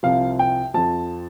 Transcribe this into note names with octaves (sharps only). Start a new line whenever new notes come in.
C2 C3 F3 F5
G5
F2 F3 A5